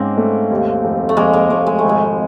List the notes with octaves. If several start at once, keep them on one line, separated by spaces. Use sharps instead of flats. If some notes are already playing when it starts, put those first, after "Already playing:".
Already playing: G#2 A#3 C4 C#4
A3
D#2
F1
A3
F1 G#3 A#3
G#3 A#3
F1 A3
G#3
G#1 A3
G#3